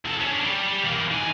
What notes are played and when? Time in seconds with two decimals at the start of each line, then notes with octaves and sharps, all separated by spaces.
0.05 E2 A4
0.20 C#4 D4
0.44 G3 G4
0.84 E3 A#3
1.11 D#3 G#5